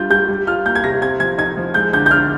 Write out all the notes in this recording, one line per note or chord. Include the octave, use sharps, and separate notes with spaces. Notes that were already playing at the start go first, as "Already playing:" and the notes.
Already playing: G3 D4 F4 G6
G3 G6
G3
F4 F6
A#3 G6
G#6
C3 A#6
C4 G#6
F3 G#6
D#4 G#6
F3
G#3 G6
D3 G6
G6
D4 F6